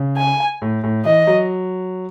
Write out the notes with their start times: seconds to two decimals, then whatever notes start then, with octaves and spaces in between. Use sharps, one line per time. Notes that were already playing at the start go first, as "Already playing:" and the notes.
Already playing: C#3
0.17 G#5
0.62 A2
0.83 A2
1.05 E3 D#5
1.27 F#3